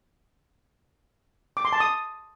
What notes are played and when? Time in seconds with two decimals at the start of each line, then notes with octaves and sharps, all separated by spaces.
1.57 D6
1.65 C6
1.72 A5
1.80 D#6